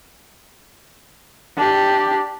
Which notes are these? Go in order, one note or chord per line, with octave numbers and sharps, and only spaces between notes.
D4 G4